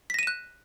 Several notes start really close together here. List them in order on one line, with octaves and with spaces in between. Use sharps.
B6 A#6 D#7 E7 F#6